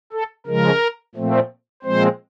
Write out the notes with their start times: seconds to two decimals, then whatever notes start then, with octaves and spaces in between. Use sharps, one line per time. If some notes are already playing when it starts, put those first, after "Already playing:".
0.13 A4
0.46 C#3 F3 G#3 A#4
1.15 A#2 F3 A3 C4
1.83 A#2 F3 G#3 C4 C5